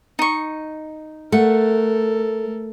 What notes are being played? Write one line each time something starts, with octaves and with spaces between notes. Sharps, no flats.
D#4 C#6
A3 A4 A#4 F#5